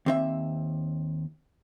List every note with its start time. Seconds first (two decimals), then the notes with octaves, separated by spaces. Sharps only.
0.06 D#2 C4 E5